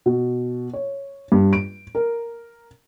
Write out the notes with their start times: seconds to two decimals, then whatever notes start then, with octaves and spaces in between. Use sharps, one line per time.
0.06 B2
0.73 C#5
1.32 G2
1.53 D7
1.95 A#4